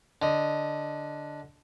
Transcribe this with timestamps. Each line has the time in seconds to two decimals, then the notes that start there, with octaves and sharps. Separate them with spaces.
0.22 D3 D#5